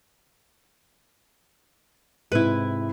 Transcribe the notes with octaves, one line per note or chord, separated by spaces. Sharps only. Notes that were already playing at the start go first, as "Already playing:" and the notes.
G#2 C3 E4 B4